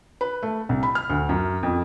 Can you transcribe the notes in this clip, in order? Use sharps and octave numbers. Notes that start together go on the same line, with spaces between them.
B4
A3
C2
B5
F6
D2
F#2
F2